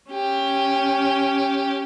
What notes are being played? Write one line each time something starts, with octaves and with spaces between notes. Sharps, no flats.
C#4 G4